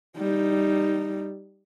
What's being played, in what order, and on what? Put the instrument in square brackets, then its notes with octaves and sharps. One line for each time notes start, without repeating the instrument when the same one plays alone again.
[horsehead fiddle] G3 D#4